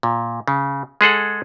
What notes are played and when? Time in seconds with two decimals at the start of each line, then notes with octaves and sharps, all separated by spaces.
0.03 A#2
0.48 C#3
1.01 G#3 G#4 A4 F#5